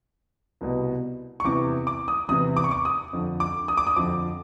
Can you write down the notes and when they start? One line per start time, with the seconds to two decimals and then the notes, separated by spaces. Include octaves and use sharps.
0.61 C2 B2
1.40 C#6
1.45 E2 C3 E3 D6
1.87 D6
2.08 D#6
2.29 E2 C3 E3 D#6
2.57 D6
2.64 C#6
2.71 D6
2.85 D#6
3.13 F2 D3 F3
3.40 D6
3.68 D#6
3.77 D6
3.87 D#6
3.96 F2 D3 F3 D6